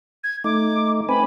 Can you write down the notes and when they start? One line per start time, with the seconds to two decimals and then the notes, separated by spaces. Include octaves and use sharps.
0.24 G#6
0.44 A3 D#4 D6
1.09 C4 B4 G#5 B5